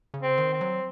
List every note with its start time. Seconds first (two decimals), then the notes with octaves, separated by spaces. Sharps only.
0.14 C#3
0.22 C4
0.38 D#3
0.53 C4
0.61 F#3